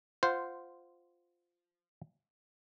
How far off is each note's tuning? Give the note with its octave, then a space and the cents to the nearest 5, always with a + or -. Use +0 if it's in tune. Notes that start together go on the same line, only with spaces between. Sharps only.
F4 +0 C5 -5 F#5 +10